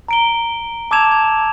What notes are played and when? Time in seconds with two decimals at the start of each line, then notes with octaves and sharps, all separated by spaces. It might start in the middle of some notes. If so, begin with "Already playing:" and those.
0.08 A#5 D7 G7
0.91 A5 D6 E6 G#6 E7 F7
1.11 G#6